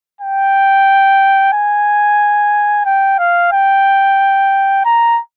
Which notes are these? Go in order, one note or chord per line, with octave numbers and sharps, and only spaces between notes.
G5
G#5
G5
F5
G5
A#5